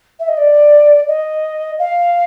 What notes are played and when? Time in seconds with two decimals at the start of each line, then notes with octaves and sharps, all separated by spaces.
0.19 E5
0.28 D#5
0.37 D5
1.07 D#5
1.79 F5